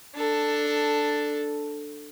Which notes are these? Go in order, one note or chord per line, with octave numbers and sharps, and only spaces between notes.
D4 A4